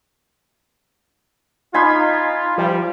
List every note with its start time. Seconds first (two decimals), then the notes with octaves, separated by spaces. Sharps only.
1.74 D#4 F4 G#5 B5 C6
2.58 F3 G3